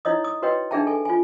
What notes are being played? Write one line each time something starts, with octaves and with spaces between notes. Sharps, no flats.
D#4 E4 C#5 D#5 D#6
D#6
F#4 B4 C#5 D#5 G5
D4 D#4 G#4 E5 G5 A5
A4 G#5
F4 G#5